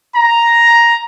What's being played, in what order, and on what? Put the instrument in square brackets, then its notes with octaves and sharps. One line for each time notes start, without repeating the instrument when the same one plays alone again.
[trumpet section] A#5